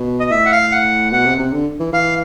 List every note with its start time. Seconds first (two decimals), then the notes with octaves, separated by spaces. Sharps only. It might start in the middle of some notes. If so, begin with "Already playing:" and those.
Already playing: B2
0.20 D#5
0.31 A2 E5
0.46 F#5
0.52 F5
0.72 F#5
1.12 B2 F#5
1.26 C3
1.39 C3
1.53 D3
1.80 E3
1.93 E3 F5